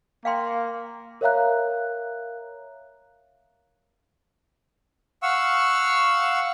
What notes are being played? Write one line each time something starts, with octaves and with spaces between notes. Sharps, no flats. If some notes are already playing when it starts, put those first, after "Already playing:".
A#3 F5 G5 C6
A#4 C#5 E5 F5 A#5 F#6
F5 F#5 C#6 E6